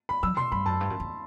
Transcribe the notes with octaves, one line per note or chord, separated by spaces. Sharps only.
B5
F#3 E6
B2 C6
G2 B5
F#2 A5
G2
F#2
E2